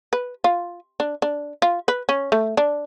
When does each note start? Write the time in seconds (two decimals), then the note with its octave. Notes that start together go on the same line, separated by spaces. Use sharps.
0.13 B4
0.44 F4
1.00 D4
1.22 D4
1.62 F4
1.88 B4
2.09 C#4
2.32 A3
2.57 D4